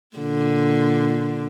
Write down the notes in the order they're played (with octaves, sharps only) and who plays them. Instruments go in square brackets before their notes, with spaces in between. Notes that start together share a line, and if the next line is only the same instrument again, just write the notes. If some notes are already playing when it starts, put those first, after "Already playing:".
[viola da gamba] A#2 D3